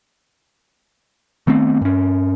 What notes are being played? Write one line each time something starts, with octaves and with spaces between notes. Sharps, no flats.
D#3 A3 B3 C4
G2 C#4